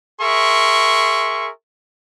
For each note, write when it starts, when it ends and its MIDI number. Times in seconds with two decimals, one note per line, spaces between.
0.21 1.50 68
0.21 1.50 70
0.21 1.50 76
0.21 1.50 84
0.21 1.50 85